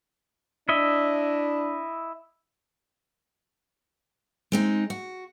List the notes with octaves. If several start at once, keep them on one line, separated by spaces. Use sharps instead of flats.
D4 E4 D#5 E5
G#3 C4 D#4
F#4